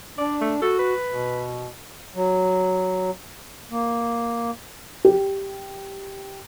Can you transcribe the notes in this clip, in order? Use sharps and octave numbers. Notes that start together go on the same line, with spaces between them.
D4 D5
A3
F#4 A4
B4
B2
F#3
A#3
G4